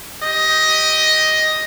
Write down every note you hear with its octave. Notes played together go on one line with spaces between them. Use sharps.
G4 D#5